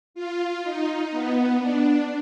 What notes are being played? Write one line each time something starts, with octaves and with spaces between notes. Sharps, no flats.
F4
D#4
B3
D4